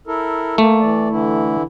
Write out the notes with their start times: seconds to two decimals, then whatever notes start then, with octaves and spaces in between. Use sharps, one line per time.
0.07 E4 A4 A#4
0.58 A3 A#3
0.80 E3 D5
1.10 D3 E3 E4